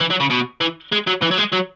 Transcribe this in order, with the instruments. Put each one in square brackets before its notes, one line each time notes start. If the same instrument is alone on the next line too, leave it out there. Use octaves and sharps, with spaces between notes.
[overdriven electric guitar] E3
F#3
C#3
B2
E3
G#3
F#3
E3
F#3
G#3
F#3